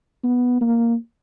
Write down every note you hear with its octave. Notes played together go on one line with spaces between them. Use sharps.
B3
A#3